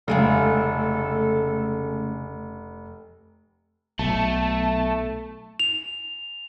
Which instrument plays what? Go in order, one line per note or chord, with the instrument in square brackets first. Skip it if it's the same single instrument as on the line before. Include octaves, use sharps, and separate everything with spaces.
[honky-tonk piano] F1 [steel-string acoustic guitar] C#3 G#3 A3 [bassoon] A4
[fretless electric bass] B1 [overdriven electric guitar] A3 [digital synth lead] A5
[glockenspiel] F7